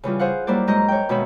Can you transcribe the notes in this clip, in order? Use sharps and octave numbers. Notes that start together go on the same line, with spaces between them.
C#3 E3 G3 F4
G#4 C5 F5 F#5
F#3 G3 A#3 E4 C5 D5
G#2 F#3 G#3 D#5 A#5 G6
C#5 G5
B2 D#3 G#3 C#5 E5 B5